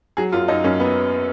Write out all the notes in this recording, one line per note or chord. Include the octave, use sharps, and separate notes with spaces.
F#3 G#4
F#2 F4
F#2 D#4
F#2 C#4
B3